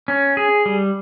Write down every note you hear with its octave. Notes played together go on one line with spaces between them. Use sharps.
C#4
G#4
G3